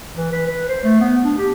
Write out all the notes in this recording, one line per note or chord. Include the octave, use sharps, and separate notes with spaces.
E3
B4
B4
C5
A3
B3
D4
G4